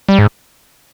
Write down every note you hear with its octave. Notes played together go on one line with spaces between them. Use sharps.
G3
G#2